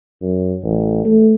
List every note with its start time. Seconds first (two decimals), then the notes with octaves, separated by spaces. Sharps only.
0.22 F#2
0.64 A1
1.05 A3